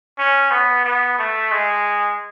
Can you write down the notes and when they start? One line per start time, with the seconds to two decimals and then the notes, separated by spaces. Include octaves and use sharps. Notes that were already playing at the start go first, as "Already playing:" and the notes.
0.18 C#4
0.51 B3
0.85 B3
1.19 A3
1.52 G#3